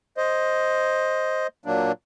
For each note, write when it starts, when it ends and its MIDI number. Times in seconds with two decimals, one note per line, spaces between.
0.17 1.47 72
0.17 1.47 75
1.66 1.92 46
1.66 1.92 54
1.66 1.92 58
1.66 1.92 62